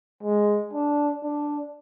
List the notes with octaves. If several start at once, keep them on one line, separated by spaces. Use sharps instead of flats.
G#3
D4
D4